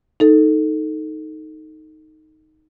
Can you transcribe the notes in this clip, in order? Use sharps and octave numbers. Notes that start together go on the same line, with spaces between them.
D#4 A4